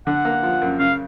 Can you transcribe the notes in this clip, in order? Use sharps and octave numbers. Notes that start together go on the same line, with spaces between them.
D3 F#5
A#3
F3
F#2
C#3 F5